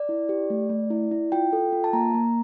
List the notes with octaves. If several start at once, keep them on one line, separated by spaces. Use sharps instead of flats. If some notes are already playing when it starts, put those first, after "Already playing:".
Already playing: D5
E4
G4
A3
A3
E4
E4
F4 G5
A4
F4
A5
A#3 A#5
A#3